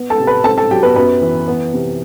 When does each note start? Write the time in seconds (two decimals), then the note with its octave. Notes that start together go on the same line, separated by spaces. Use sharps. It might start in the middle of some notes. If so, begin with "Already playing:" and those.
Already playing: B3
0.10 A4 A5
0.20 C3
0.27 B4 B5
0.44 C4 A4 A5
0.58 A4 A5
0.71 F#3 G4 G5
0.83 B3 B4
0.96 F#2 B3 B4
1.22 E3
1.48 B3
1.74 C3